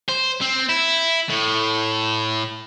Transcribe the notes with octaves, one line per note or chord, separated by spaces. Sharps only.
C5
C4
E4
A2